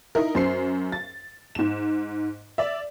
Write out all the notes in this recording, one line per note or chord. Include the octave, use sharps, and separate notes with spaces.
D#4 E4 A#4
F#2 C5 C7
A6
G#2 E7
D5 E5